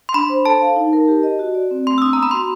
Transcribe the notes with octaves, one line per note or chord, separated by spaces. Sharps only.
C6
D4 B5
C5
A4 A5
F5
D#4
A#4
G4
D#5
F#4
D5
C4
A3 C6
E6
D4 D#6
A#5
B3
B5
F#4 C6